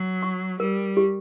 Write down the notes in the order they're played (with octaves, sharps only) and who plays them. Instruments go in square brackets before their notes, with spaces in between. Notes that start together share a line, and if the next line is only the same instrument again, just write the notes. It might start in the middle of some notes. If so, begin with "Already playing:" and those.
Already playing: [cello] F#3
[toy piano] C#6
[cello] G3 [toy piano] A#4
[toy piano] G4